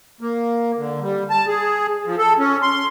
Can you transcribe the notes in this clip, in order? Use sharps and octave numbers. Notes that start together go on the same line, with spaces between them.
A#3
D3
G3
A5
G#4
F3
A4
C#4
C6